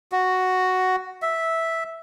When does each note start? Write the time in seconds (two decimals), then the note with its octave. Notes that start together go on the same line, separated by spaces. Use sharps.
0.12 F#4
1.22 E5